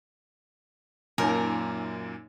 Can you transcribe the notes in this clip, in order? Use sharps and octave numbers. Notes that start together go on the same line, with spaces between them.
F#2 A#2 A#3 D#4 A#4 C#5 G#5